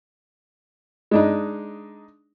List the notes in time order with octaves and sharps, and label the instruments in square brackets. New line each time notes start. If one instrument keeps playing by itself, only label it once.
[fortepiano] G#3 D4 D#4